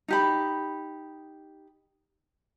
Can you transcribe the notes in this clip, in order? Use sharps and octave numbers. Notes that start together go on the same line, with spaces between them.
D#4 G4 B5